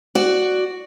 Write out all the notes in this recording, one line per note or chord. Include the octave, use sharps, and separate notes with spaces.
F#4 D5